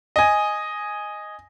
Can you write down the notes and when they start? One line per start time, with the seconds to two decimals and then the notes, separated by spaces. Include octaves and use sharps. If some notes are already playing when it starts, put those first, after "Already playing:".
0.16 D#5 G#5